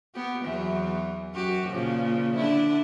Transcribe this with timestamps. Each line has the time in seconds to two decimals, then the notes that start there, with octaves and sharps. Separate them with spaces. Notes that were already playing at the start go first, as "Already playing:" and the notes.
0.15 B3 G4
0.43 E2 E3 F#3
1.34 F#2 F#4 G4
1.70 A#2 C#3 F3
2.36 D3 D4 E4